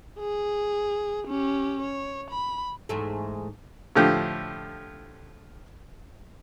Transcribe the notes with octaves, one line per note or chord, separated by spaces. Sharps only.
G#4
C#4 G4
C#5
B5
E2 G#2 A3
A2 D3 F3 G4